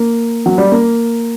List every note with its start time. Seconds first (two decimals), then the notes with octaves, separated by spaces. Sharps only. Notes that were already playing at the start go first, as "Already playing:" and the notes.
Already playing: A#3
0.46 F#3
0.58 G3
0.72 A#3